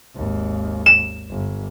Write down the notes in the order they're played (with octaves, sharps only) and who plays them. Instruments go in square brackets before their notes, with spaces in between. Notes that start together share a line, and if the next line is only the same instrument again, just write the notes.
[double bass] G#1 D#2
[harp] E7
[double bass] G1